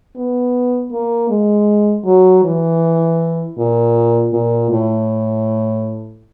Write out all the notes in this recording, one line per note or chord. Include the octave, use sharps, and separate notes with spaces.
B3
A#3
G#3
F#3
E3
A#2
A#2
A2